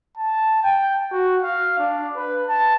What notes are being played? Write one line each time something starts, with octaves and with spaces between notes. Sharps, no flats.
A5
G5
F#4
F5
D4
B4
A5